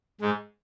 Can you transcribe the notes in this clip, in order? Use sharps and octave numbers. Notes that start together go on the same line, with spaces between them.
G#2 G#3